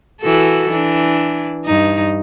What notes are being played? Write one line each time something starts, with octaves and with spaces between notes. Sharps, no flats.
E3 F#4 A4
E3 D4
G2 D#4